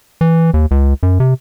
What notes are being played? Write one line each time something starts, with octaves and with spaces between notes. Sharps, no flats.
E3
D#2
C#2
F#2
C3